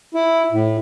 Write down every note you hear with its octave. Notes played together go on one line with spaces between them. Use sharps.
E4
A2